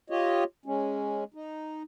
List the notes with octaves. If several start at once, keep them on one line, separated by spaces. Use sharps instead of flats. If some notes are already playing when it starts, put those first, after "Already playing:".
F4 G4 C#5 D#5
G#3 C#4
D#4